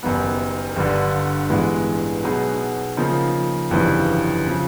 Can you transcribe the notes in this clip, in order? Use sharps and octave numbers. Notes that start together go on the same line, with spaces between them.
F#1 F#2 D#3 G3 B3
G1 G2 D3
A1 G2 E3 G#3 B3
B2 F#3 B3 D#4 G#4
C#3 F3 A#3 D#4
G1 F2 C#3 E3 G3
C#3 F3